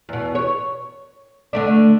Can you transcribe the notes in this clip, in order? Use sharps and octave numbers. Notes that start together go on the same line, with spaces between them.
E2 B2
C#5
D3 A3 D4